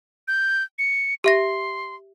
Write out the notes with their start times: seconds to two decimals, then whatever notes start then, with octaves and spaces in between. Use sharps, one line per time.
0.28 G6
0.78 C#7
1.24 G4 E5 C6 A#6